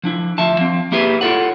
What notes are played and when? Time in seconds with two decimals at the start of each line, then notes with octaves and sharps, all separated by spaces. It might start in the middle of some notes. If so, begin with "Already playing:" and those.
0.04 F3 D4 E4
0.38 D2 F3 E5 A5
0.58 F3 C4
0.92 A#3 E4 G4 G#4 B4
1.21 E4 F4 G4 A4 C#5 F#5